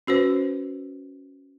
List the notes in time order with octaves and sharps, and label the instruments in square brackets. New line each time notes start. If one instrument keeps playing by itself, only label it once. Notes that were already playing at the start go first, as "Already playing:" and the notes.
[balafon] C#4 F#4 B4 C5